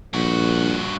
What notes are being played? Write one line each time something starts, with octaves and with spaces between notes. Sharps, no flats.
A#1 G2 F#4